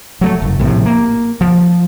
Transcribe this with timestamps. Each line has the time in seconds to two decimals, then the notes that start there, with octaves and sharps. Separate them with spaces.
0.21 F#3 A3
0.42 F#1
0.59 A#1 A2 C3
0.86 A#3
1.41 F3